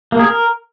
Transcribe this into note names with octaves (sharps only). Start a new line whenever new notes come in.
A#3
G#4
A#4